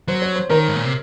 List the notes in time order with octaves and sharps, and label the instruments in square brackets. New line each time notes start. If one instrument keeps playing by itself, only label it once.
[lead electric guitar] F#3 [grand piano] C5
[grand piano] C#5
C5
[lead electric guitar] D#3 [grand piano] A#4
[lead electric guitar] G#2
A#2
C3